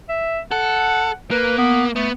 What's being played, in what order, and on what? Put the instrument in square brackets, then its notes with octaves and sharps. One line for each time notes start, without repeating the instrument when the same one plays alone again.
[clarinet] E5
[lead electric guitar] A4 [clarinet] F#5
[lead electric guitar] A#3 [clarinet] B4
[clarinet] B3
[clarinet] A3 [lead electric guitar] B3